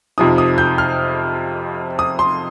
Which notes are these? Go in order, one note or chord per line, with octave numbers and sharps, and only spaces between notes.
F2 C3 F3 D#4 D#6
D#6
G6
F6
D#6
C6